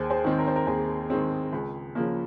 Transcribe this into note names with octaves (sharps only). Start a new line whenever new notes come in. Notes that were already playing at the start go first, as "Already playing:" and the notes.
Already playing: D#2 G#4 C5
G#4 C5
D#3 G#3 C4
A#4
C5
A#4
D#2 G#4
D#3 G#3 C4
C#2
C#3 F3 A#3